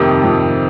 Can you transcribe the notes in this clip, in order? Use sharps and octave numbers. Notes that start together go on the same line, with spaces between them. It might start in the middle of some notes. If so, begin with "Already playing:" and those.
Already playing: F2 C3 D#3
F2